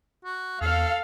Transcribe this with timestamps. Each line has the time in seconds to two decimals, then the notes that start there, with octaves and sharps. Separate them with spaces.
0.25 F#4
0.61 E2 A4 F5